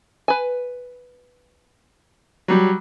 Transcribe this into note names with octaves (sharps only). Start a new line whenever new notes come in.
B4 G#5
F#3 G3